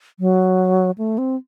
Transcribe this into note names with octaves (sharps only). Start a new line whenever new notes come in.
F#3
A3
C4